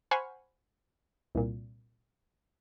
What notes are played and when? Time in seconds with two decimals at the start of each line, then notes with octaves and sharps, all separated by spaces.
0.11 C5 F#5 G#5 B5 C#6 F6
1.35 C2 A#2